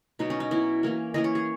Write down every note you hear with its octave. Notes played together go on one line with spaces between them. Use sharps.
B2 F#3 B3 D#4
C#4
D#4
B2 F#3 B3 E4
E3 A#3 C#4
E3 A#3 C#4 D#5
C#5
G#4